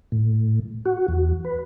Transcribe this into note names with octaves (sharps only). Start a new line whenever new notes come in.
A2
F#4
E2
B4